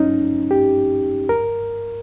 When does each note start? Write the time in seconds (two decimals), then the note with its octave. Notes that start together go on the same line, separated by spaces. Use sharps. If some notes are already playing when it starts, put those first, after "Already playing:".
Already playing: C#4 D#4
0.51 G4
1.29 A#4